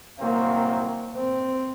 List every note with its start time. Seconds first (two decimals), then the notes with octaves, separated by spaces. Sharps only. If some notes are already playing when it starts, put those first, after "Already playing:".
0.20 C2 C3 D#3 F#3 A#3 C4
1.17 C4